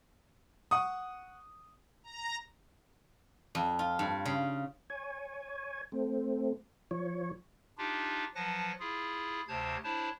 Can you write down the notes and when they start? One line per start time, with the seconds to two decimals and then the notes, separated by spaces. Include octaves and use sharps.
0.71 F#5 C#6 D#6
2.03 A#5
3.55 F2
3.79 F4
3.99 G2
4.25 C#3
4.90 C#5 G#5
5.92 A3 C4
6.91 F3 C#5
7.78 D4 D#4 F4 G4
8.35 F3 F#3 B4 F#5 A5 A#6
8.80 E4 F4 G#4
9.48 D2 C3 C5 C#5 A5 G#6
9.84 D4 E4 C5 C#5 A5